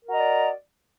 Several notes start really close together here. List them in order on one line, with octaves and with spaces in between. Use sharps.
A#4 F#4 A#5 D#5 D5